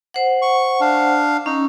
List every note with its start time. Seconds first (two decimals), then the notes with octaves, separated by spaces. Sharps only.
0.14 C5 F#5
0.42 C#6
0.81 D4 F5
1.46 C#4 D#4